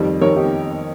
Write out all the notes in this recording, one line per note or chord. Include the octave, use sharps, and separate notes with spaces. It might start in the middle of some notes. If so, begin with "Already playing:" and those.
Already playing: F2 D#3 G3
F2 D#3 G3 A#4 C#5
D#4 G4